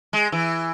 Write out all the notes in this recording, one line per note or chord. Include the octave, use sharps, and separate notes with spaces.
G#3
E3